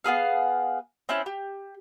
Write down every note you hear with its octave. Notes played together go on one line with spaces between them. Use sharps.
B3 C4 G#4 F5
C4 C#4 E4 F#6
G4